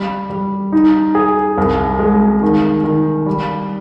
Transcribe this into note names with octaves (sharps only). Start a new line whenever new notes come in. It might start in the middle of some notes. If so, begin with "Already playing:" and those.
Already playing: G3
G3
D#4
G#4
C2
G#3
D#3
D#3
G3